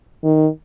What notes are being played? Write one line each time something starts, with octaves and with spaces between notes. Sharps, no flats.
D#3